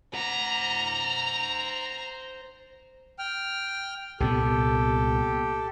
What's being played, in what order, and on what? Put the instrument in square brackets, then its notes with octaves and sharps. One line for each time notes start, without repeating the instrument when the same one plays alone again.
[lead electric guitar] C5 F#5 [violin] A#5
[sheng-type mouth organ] G5 F6
[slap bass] C2 A#2 B3 [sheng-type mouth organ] G4 A4